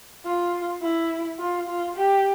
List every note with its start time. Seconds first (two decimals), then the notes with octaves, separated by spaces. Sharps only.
0.25 F4
0.82 E4
1.39 F4
1.68 F4
1.96 G4